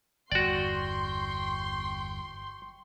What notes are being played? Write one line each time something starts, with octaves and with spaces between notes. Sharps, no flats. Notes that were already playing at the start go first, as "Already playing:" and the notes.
G1 E2 F#4 D5 G5 C6 C#6